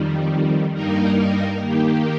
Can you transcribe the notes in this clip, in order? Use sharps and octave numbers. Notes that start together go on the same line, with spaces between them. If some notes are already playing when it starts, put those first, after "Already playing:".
Already playing: F2 D#3 G3
G2 G3 A#3 D#4 A#4
D#3 A#3 G4